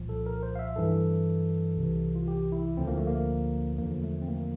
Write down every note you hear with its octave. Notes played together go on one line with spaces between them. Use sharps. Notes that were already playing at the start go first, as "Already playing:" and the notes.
Already playing: C2 A#2 F3
A4
A#4
C5
F5
E5
G2 E3 A4
C2 C3 E3
F4
G4
E4
D2 D3 F3 C4
A#3
A3
A#3
E2 D3 F3 A#3
A#3
A3
C4
A#3